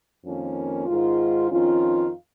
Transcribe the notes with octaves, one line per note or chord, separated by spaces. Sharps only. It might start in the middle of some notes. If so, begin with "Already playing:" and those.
F2 D#3 A#3 C#4
G#2 D#3 G#3 F4
F2 D#3 C#4 F4